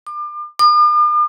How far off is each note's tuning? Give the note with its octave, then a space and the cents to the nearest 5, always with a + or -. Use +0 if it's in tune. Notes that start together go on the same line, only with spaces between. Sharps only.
D6 +35
D6 +45